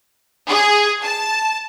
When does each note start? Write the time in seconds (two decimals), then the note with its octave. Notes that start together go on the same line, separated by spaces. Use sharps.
0.49 G#4
1.03 A5